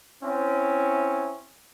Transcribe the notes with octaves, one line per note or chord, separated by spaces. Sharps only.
C4 C#4 E4